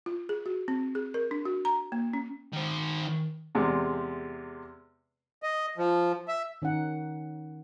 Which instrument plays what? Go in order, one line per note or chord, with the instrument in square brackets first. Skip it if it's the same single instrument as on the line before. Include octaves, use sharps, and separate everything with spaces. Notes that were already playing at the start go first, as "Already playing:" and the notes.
[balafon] F4
G#4
F#4
C4
G#4
A#4
D4
F#4
A#5
A#3
C#4
[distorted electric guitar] D#3 C5
[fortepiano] E2 C3 G#3
[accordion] D#5
F3
E5
[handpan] D#3 C#4 D#4 F#5